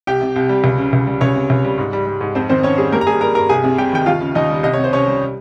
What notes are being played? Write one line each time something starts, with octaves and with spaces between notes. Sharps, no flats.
C2 G4 G5
C3
C2
G3
C#2
C#3
C#2
G3
C#2 C#4 C#5
C3
C#2
G3
G#2
G3
G3
G#2
F2 C4 C5
D#3 C4 C5
F2 C#4 C#5
G3 G#4
G2 A#3 A#4
A#5
G3 G#4 G#5
G3 A#4 A#5
G2 A#4 A#5
C2 G#4 G#5
C3
G3 G4 G5
D#3 G5
D#2 F4 F5
C#3
D#2 D#4 D#5
G3
C2 D#5
C3 C#5
C5
C2 C#4 C#5
G3